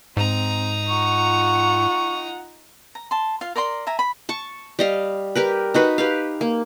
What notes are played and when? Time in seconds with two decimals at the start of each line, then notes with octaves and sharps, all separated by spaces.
0.17 G#2 C4 D#4 A#5
0.89 F4 F#5 C#6
2.95 A#5
3.11 A5 C6
3.41 F4 F5
3.56 A#4 D5 A#5 C6
3.87 E5 G#5 A#5
3.99 B5
4.29 A5 C#6
4.79 G3 D#5 F5
5.35 G4 A#4 B4
5.74 D#4 F#4 B4
5.98 G4 B4 F5
6.41 A#3